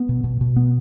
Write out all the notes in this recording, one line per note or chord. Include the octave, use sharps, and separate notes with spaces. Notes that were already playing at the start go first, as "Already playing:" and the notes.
Already playing: B3
B2
B2
B2
B3